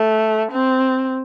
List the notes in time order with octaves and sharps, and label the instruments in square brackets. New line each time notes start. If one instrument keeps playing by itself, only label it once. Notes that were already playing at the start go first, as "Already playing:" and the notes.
Already playing: [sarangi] A3
C4